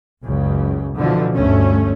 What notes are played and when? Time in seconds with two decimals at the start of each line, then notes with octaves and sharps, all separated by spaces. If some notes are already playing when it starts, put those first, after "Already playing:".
0.23 F#1 C#2 C#3
0.95 B2 D3 E3 F3
1.34 G1 D2 A3 C#4